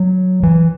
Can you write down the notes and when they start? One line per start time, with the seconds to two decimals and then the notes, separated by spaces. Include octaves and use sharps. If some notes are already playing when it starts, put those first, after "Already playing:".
Already playing: F#3
0.43 E3